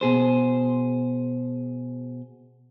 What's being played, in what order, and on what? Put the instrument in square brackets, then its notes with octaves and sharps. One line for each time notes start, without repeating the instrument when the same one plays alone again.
[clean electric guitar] B2 G#4 C5